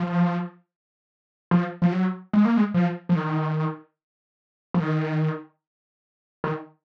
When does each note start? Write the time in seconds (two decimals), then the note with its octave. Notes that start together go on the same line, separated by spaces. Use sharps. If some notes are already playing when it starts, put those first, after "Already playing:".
Already playing: F3
1.51 F3
1.82 F3
1.92 F#3
2.33 G#3
2.45 A#3
2.57 G#3
2.74 F3
3.09 F3
3.16 D#3
4.74 F3
4.80 D#3
6.44 D#3